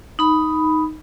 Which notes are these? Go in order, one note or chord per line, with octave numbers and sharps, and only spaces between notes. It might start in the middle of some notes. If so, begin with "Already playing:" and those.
D#4 B5